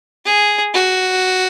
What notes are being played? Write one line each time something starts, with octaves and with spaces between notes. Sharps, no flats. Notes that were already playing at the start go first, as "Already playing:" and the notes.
G#4
F#4